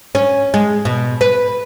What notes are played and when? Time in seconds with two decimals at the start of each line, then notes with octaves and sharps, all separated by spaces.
0.15 C#4
0.54 G#3
0.85 B2
1.21 B4